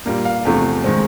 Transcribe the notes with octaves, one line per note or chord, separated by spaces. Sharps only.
A#2 G3 A#3
F5
E2 C3 F3 A3
D#3 G#3 C4